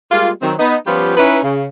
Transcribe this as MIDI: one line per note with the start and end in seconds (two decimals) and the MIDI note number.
0.12 0.30 55
0.12 0.30 56
0.12 0.30 58
0.12 0.30 65
0.42 0.54 51
0.42 0.54 54
0.42 0.54 60
0.59 0.76 59
0.59 0.76 63
0.87 1.15 53
0.87 1.15 55
0.87 1.15 59
0.87 1.15 61
0.87 1.15 65
0.87 1.15 67
1.17 1.39 61
1.17 1.39 63
1.17 1.39 64
1.17 1.39 71
1.44 1.66 49